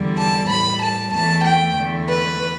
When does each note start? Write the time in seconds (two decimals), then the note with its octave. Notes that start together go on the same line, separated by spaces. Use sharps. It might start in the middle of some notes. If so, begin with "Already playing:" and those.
Already playing: E2 D3 G3
0.17 A5
0.49 A2 G3 B5
0.81 A5
1.12 E2 E3 A3 A5
1.43 G5
1.76 E2 D3 A3
2.07 B4